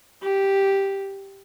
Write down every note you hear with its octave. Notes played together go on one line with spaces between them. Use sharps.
G4